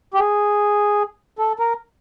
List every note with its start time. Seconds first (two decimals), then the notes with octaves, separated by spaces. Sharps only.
0.14 G4
0.19 G#4
1.39 A4
1.59 A#4